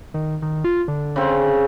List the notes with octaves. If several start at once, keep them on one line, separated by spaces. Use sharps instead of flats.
D#3
D#3
F4
D3
C#3 C4